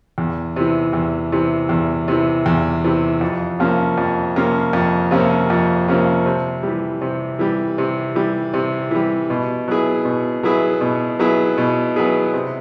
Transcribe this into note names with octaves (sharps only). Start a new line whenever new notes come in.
E2
C3 E3
E2
C3 E3
E2
C3 E3
E2
C3 E3
F2
C3 F3 A#3 C#4
F2
C3 F3 A#3 C#4
F2
C3 F3 A#3 C#4
F2
C3 F3 A#3 C#4
C3
E3 G3
C3
E3 G3
C3
E3 G3
C3
E3 G3
B2
F#3 B3 E4 G#4
B2
F#3 B3 E4 G#4
B2
F#3 B3 E4 G#4
B2
F#3 B3 E4 G#4
C3